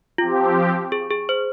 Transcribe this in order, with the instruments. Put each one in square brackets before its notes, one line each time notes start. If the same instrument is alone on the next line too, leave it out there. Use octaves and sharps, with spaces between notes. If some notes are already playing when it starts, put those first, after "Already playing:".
[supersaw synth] F3 C4 G4 [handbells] F4
[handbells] G#4
G#4
C5